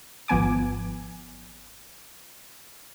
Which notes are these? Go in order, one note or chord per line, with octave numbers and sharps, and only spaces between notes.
G#1 F3 B3 G#5 D6